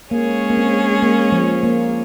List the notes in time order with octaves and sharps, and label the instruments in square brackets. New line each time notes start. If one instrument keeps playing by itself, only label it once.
[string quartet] G#3 C#4 G#4 C#5 [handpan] A#3
[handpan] A#3
C4
A#3
F3
A#3